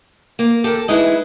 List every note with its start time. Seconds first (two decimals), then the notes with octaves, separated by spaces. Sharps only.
0.39 A#3
0.64 G4 A4 A#4
0.88 G#3 D#4 E4 G#4 B4